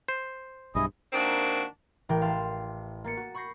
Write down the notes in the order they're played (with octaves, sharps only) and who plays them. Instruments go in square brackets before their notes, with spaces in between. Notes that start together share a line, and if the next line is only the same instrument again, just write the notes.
[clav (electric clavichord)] C5
[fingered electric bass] B1 G2 [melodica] E4 G#4 D#5
[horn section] D#3 A#3 C4 D4 F#4
[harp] A1 E3 A#4 G5
B4 F5 A5 C6
A#3 A6 C#7
F#4
B5 C#6 G6 A#6 C7